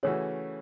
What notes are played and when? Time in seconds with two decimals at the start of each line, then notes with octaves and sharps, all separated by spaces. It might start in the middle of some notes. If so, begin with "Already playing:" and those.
0.03 C#3 E3 A3 C#4 F#4 C#5